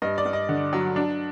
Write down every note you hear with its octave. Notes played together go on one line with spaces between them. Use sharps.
G2 D#5
D5
G2
D#5
D3
F#3
D4